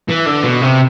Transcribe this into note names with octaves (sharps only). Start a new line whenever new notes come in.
E3
D3
B2
C3